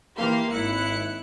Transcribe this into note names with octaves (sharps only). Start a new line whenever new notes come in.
E3 A#3 G4 F5 C6
G#1 E4 F#6 C#7